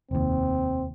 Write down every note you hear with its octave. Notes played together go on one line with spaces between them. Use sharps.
F1 D#2 C4